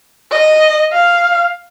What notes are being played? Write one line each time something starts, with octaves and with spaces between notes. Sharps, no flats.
D#5
F5